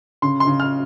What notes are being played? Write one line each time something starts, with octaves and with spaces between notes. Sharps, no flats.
C#3 C6
C6
C#3
F6